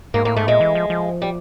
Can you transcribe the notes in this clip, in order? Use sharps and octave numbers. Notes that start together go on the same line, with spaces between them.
G#2 A#3
A2 A#3
G#2 A3
A#2 G#3
E3
F3
F3
G3